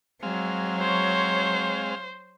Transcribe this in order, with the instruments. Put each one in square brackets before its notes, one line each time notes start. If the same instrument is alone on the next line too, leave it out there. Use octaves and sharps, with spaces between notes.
[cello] F#3 [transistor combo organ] G#3 C4 F5
[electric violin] C5 [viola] C#5